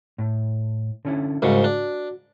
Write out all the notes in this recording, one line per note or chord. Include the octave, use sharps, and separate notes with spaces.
A2
D3 C#4 E4
C2 G#2 C#3 F#4
D4